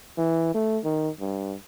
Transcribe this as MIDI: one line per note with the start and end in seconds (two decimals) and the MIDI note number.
0.18 0.51 52
0.55 0.78 57
0.84 1.09 51
1.20 1.55 43